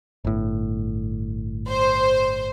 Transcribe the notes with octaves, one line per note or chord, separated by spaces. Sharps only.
G1 A2
C5